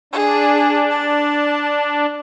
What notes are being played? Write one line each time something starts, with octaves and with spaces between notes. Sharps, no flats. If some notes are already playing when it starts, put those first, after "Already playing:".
D4 G#4
A5